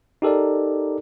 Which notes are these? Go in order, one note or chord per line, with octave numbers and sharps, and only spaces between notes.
D#4 G4 A4 A#4 D5